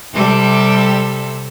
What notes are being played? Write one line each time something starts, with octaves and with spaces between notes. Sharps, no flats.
C3 G3 A4